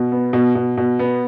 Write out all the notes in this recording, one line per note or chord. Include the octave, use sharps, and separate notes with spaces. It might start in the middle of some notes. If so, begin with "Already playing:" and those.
Already playing: B2
B3
B2
B2
B2
B3